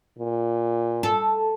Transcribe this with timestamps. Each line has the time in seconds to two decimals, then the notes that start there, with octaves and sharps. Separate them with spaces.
0.19 A#2
1.03 A4